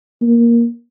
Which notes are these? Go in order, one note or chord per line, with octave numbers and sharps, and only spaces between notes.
A#3